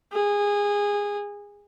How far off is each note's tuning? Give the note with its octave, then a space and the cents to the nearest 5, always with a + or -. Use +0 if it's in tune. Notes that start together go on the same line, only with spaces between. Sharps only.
G#4 -20